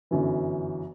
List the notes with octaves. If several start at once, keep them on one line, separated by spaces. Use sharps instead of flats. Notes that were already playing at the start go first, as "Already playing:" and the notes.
G1 F#2 E3